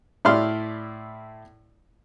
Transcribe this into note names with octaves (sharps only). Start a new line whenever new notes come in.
A2 E4 D5 C6 F6